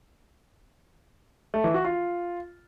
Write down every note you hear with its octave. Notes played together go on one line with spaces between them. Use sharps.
A3
E3
F#4
F4